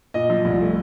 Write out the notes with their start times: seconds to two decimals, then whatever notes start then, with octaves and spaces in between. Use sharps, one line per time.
0.14 A#2 D#5
0.30 F3
0.45 C2
0.60 A3